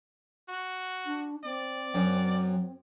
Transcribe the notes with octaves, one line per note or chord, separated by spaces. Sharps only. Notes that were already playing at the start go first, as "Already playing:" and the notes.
F#4
D4
C4 D5
F#2